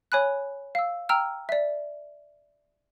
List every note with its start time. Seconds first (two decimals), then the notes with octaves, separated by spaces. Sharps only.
0.12 C#5 G#5 B5 F#6
0.75 F5 E6
1.09 G5 A#5 E6 F6
1.49 D5 E5